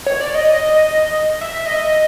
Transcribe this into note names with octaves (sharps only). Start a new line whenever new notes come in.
C#5
D5
D#5
D#5
E5
E5
D#5